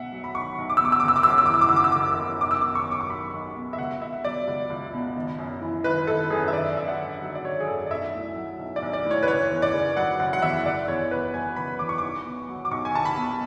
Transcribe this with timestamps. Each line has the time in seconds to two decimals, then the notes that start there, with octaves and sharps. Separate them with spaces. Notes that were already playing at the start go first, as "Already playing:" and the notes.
Already playing: B1 B2 E5 F#5
0.12 F#3
0.24 B5
0.35 B1 C#6
0.58 B1
0.70 D6
0.77 E6
0.81 B2 D6
0.92 E6
1.00 D6
1.04 F#1 E6
1.16 D6
1.23 E6
1.27 F#2 D6
1.38 E6
1.46 D6
1.50 E3 E6
1.61 D6
1.69 E6
1.73 F#1 D6
1.84 E6
1.92 F#1 D6
2.18 F#2
2.41 B1 D6
2.51 E6
2.61 D6
2.64 B2
2.75 C#6
2.87 F#3 D6
3.01 C#6
3.10 B1 B5
3.33 B1
3.56 B2
3.73 E5
3.78 C#2 F#5
4.01 B2 E5
4.24 F#3 D5
4.47 C#2
4.70 C#2
4.93 B2
5.16 G#1
5.39 F#2
5.61 E3
5.84 G#1 B4
6.07 G#1 A4
6.30 F#2 G#4
6.48 E5
6.53 G#1 D5
6.76 F#2 E5
6.88 F#5
6.99 D3
7.22 F#3
7.35 D5
7.45 G#1 C#5
7.60 G#4
7.68 F#2 A4
7.86 D5
7.90 B1 E5
8.14 A2
8.36 F#3
8.59 B1
8.76 D5
8.82 B1
8.93 D5
9.05 A2
9.11 C#5
9.23 B4
9.27 F#1 C#5
9.51 E2
9.62 D5
9.73 C#3
9.97 F#3 F#5
10.19 F#1 F#5
10.33 F#5
10.42 E2 E5
10.65 F#1 D5
10.88 E2 C#5
11.11 B2 B4
11.34 F#3 G#5
11.56 F#1 B5
11.79 E2 D6
11.89 C#6
11.98 B1 D6
12.25 B2
12.49 F#3
12.65 D6
12.71 B1 C#6
12.85 G#5
12.95 B1 A5
13.05 B5
13.17 B2